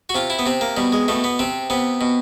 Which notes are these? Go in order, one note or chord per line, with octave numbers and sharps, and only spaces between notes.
F#4
C3 F4
E4
B3
C3 C4
A#3
B2 G3
G#3
B2 A3
B3
C3 C4
C3 B3
B2